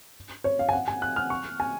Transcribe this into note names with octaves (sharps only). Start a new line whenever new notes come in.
C#5
F5
G#5
F#5
G#5
F#6
F6
C#6
G#5